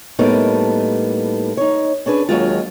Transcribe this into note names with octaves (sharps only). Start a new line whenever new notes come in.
A2 G3 A#3 B3 D#4 A4
D#4 C#5
C#4 D4 G#4 B4
D#2 F#3 G#3 F4